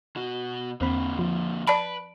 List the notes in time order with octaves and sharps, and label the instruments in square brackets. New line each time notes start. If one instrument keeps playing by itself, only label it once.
[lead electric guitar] B2 F#4
[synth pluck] E2 C4 B5 [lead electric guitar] D3 A#3
[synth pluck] F3
[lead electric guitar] B4 [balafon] D5 A5 B5 [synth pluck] D7